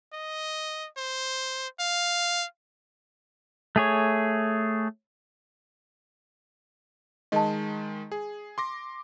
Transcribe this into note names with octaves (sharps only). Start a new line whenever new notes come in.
D#5
C5
F5
A3 G#4 C#5
D#3 G#3 D#5 A5
G#4
C6 D6 A#6